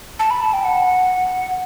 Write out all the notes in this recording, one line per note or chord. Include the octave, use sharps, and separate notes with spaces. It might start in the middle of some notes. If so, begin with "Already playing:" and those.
A5
B5
A5
G5
F#5